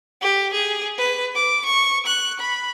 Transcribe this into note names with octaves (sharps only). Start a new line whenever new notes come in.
G4
G#4
B4
D6
C#6
F#6
B5